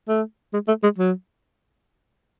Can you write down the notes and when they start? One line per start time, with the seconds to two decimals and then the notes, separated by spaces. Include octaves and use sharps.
0.08 A3
0.53 G#3
0.68 A3
0.83 G#3
0.98 F#3